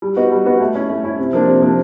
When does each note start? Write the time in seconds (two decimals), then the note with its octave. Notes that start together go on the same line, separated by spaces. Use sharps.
0.02 G3
0.16 B3 D#4 F#4
0.32 G3
0.46 B3 D#4 F#4
0.60 A3
0.75 C#4 E4
0.89 A3
1.04 C#4 E4
1.19 C3
1.33 F3 A#3 D4
1.48 C3
1.62 F3 A#3 D4